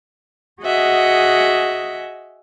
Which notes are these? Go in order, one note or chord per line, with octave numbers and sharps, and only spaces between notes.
F#4 G#4 D#5 E5 F#5